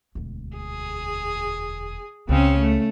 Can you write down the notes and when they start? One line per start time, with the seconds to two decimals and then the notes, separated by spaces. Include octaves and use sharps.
0.15 E1 D2
0.56 G#4
2.29 C#2 C#3 C4 C#4
2.60 A3